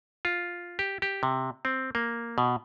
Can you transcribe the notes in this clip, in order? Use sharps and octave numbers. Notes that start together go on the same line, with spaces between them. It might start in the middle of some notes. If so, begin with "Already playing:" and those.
F4
G4
G4
C3
C4
A#3
B2